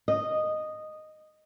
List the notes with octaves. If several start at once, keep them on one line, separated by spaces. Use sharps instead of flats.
D#5